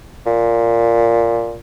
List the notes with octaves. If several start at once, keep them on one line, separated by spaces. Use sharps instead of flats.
A#2